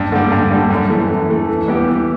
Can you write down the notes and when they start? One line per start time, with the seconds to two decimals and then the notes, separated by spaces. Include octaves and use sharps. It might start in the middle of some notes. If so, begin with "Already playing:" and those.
Already playing: G2
0.12 D3 G3
0.32 G2
0.51 D3 G3
0.70 F#2
0.89 E3 A3
1.09 F#2
1.29 E3 A3
1.49 E3
1.68 G3 B3 E4 G4
1.88 E3